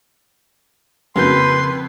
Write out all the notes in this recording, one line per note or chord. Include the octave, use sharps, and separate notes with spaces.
F2 C#3 A#3 F#4 B4 C6 G6